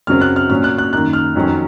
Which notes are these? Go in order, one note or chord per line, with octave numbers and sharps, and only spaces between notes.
F#2 C#3 F#3 C4 F6
F#6
F6
A#2 F#3 C#4 F6
F#6
F#6
F#2 D#3 A#3 F#6
F6
F2 D#3 F#3 A#3 C#4